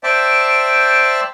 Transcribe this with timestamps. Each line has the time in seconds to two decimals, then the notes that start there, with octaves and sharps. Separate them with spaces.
0.04 C5 D5 E5 G5 A5